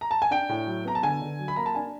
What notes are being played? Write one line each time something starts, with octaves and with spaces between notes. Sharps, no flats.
A#5
A5
G#5
D4 G5
A2
F#3
B3 A#5
A5
D3 G#5
D3
F#3
B5
A#3 A#5
A5
D4 G#5